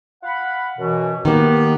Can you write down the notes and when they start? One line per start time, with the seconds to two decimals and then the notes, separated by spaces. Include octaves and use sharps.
0.24 F5 F#5 B5
0.79 F#2 B2 E3
1.25 D#3 A#3 B3 G4